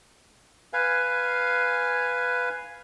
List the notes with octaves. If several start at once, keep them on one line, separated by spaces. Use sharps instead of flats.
B4 F5 G#5